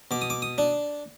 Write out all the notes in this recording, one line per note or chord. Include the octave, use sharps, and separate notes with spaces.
B2 D6
D#6
D6
D#6
D4